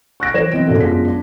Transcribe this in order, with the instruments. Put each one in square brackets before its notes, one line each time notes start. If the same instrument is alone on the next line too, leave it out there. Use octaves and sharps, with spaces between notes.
[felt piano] C#6 F#6 A#6 D7
E3 F#3 B4 C#5 G#6 E7
E3 C4 D#5 D7
A#2 C#3 E4 F#4 A4
F#2 G#3 B3 D4 F4 B6
D4